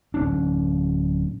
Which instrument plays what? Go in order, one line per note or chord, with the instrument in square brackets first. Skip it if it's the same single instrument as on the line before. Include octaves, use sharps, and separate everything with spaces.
[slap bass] D1 C#4 D4